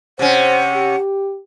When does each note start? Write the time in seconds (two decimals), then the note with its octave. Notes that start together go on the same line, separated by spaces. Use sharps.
0.19 C3 C#4 C5 F#5
0.73 G4